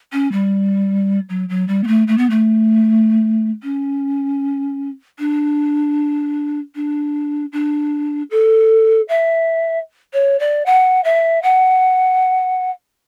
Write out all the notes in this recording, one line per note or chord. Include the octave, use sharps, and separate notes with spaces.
C#4
G3
F#3
F#3
G3
B3
A3
A3
B3
A3
C#4
D4
D4
D4
A4
E5
C#5
D5
F#5
E5
F#5